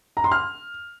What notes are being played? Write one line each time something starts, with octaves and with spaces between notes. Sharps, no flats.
A#5
C6
F6